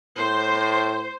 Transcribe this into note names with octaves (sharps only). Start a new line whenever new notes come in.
A2 C5